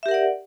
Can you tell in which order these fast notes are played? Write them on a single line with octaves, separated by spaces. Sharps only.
E5 G4 A#4 F#5 D5